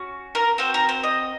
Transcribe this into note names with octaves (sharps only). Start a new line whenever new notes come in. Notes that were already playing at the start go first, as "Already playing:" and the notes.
Already playing: C#4 F#4
A#4
C4 F#4 C5
A#4
C5
D#5